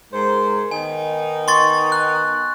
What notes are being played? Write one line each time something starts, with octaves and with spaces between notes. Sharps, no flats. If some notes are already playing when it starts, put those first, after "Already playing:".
G#2 A#4 C5
D#3 B3 D#4 G#5
C6 C#6 A6
F#6